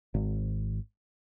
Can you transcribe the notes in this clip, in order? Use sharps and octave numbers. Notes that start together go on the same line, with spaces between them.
G#1